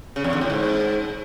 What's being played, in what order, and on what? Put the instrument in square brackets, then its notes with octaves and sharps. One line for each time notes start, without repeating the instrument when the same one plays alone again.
[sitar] C#3
E2
D3
A2
G#2